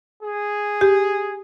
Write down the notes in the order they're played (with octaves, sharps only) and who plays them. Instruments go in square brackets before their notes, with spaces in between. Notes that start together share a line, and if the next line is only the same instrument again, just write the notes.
[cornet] G#4
[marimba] G4